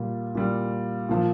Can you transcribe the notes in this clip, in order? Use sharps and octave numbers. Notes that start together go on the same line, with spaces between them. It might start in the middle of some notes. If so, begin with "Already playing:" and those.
Already playing: A#2 G3
A#2 G3
A#2 F3